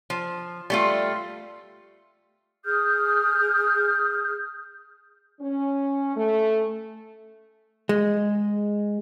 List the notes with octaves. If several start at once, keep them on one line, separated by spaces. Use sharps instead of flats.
F3
G3 A3 F4
G#4 D#6 F6 G6
C#4
A3
G#3